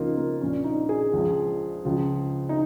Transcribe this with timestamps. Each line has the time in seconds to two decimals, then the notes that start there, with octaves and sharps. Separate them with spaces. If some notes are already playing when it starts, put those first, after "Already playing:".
Already playing: C#2 C#3 F3 A#3 D#4 F4
0.17 A#3
0.41 A#1 A#2 F3 C#4
0.64 D#4
0.89 G#4
1.13 C#2 C#3 F3
1.85 C#2 C#3 F3
2.49 D#4